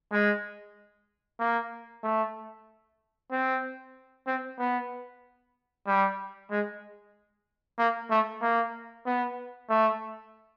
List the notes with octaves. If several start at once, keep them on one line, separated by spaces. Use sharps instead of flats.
G#3
A#3
A3
C4
C4
B3
G3
G#3
A#3
A3
A#3
B3
A3